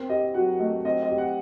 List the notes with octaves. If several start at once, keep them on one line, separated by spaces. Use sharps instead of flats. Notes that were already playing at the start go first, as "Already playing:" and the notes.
Already playing: C4 A#4
G4 D#5
F#3 F#5
A3 D#5
C4 D#5
D#5
G4
F#5